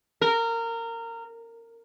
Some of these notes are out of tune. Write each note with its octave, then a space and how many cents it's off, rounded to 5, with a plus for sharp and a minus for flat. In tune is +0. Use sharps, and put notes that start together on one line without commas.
A#4 -20